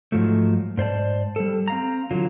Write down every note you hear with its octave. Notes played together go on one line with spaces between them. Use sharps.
G#2 F3 F#3 A3
G#2 C5 D5 A5
G3 A4
C4 F5 A#5
D3 E3 F#3 F4